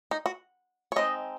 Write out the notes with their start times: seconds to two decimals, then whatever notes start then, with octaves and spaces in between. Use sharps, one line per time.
0.11 D#4
0.26 F#4
0.92 C#5
0.96 G#3 C4 D#4 D#5